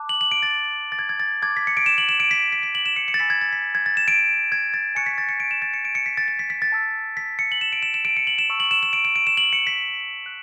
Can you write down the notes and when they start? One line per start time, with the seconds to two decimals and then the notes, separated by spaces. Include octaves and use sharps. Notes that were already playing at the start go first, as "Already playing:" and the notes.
Already playing: A5 D6 F#6
0.09 F#7
0.21 F#7
0.32 D7
0.43 A6
0.92 A6
0.99 G#6
1.09 G#6
1.20 A6
1.42 A5 D6 F#6 G#6
1.57 B6
1.67 C#7
1.77 D7
1.86 E7
1.98 F#7
2.09 E7
2.20 D7
2.31 B6
2.52 B6
2.63 B6
2.75 F#7
2.86 E7
2.96 C#7
3.08 C#7
3.14 A6
3.19 G#5 B5 E6 B6
3.30 G#6
3.41 A6
3.53 B6
3.75 G#6
3.86 A6
3.97 E7
4.08 D7
4.52 G#6
4.74 A6
4.95 G#5 C#6 F#6 C#7
5.06 B6
5.18 A6
5.29 C#7
5.40 D7
5.51 E7
5.62 A6
5.74 C#7
5.85 D7
5.95 C#7
6.06 B6
6.17 A6
6.28 A6
6.39 B6
6.50 B6
6.62 A6
6.72 A5 E6
7.17 B6
7.39 C#7
7.52 F#7
7.61 E7
7.73 D7
7.83 E7
7.94 E7
8.05 D7
8.17 C#7
8.27 F#7
8.39 E7
8.49 A5 C#6 E6
8.60 F#7
8.71 E7
8.83 E7
8.93 D7
9.05 D7
9.16 D7
9.27 E7
9.37 F#7
9.53 C#7
9.67 B6
10.26 F#6